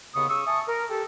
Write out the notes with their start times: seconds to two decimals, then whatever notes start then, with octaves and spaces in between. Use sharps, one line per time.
0.15 D#2 C#3 B3 C#6 D#6
0.29 C#3 C#6 D#6 E6
0.46 E5 G#5 A5 C#6 D#6
0.68 A#4
0.90 G4 A4